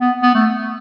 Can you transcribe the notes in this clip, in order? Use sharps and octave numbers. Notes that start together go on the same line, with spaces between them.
B3
B3
A3